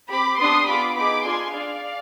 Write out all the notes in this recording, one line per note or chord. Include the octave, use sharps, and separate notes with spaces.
C4 G4 B5 D6
B3 D4 G4 C6 D#6
B3 F4 G#4 B5 D6
B3 D#4 G#4 B5 D6
D4 F4 G#4 G#5 C6
D4 G#4 D5 F5